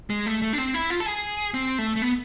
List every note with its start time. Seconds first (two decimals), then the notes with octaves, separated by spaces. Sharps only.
0.10 G#3
0.26 A3
0.42 A3
0.53 D4
0.58 C4
0.74 E4
0.90 F4
1.00 A4
1.06 G#4
1.54 C4
1.78 A3
1.96 A3
2.02 B3